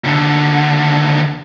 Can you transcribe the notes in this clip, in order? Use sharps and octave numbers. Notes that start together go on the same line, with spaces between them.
D#2 D3